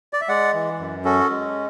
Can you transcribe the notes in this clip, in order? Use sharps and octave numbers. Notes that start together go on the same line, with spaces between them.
D5
E5
G#3 D5 F#5
E3
F#2
C#4 F#4 A4
G#3